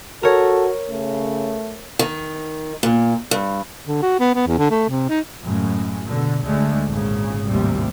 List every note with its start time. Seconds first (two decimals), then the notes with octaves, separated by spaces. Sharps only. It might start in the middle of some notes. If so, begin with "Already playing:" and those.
0.23 F#4 A4 A#4 C#5
0.90 C#3 A3
1.99 D#3
2.83 A#2
3.31 G2
3.88 D3
4.03 F#4
4.20 B3
4.35 B3
4.47 E2
4.58 D3
4.70 A3
4.90 C3
5.09 D#4
5.44 F#2 A2 C#3 G#3
6.06 B2 D3
6.41 D2 D3 G#3 A3
6.88 G#1 A#2 C#3
7.47 G#1 D#2 A2 C3 G3 C4